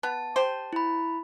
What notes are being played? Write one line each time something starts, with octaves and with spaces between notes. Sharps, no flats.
B3 A5
G4 C5
E4 B5